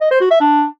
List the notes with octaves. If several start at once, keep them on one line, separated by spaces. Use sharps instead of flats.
D#5
C5
F#4
E5
D4